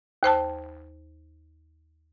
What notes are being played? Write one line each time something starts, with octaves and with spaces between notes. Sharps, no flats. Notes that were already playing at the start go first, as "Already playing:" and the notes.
D#2 C5 G5 A5